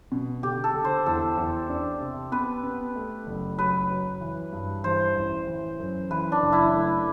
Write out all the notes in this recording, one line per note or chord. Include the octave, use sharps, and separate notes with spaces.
B2
D3 G4
A4
D3
C5
E2 A4
E2
D4
C3
B3 B4
B3
A3
F#1
F#3 B4
F#3
E3
G2
E3 C5
A1
E3
F#2
E3 B4
D4
F#1
E4
A3